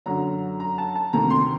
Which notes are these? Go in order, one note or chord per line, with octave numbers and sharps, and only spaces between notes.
F#2 D3 F#3 A#5
A#5
A5
A5
D2 C3 D#3 A#5
C6